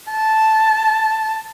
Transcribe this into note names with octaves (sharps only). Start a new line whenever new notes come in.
A5